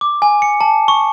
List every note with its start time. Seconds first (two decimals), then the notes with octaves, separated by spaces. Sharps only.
0.01 D6
0.22 G#5
0.42 C#7
0.61 A5
0.88 C#6